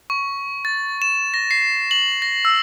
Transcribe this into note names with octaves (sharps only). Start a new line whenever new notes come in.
C#6
A6
E7
A#6
C7
F#7
A#6
E6